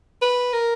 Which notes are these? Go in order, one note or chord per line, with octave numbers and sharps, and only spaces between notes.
B4
A#4